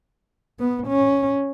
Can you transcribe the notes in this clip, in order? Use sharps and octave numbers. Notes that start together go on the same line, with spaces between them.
B3
C#4